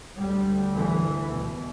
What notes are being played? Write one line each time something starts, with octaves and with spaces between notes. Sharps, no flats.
D2 G3
E3
E2 B2